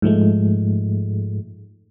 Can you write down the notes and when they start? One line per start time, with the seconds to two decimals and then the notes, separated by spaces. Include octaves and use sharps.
0.02 G#2 F3 G#3 A3